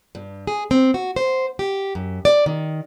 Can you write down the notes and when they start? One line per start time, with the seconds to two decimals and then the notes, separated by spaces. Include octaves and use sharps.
0.15 G2
0.47 G#4
0.71 C4
0.94 F#4
1.16 C5
1.59 G4
1.95 F#2
2.25 D5
2.46 D#3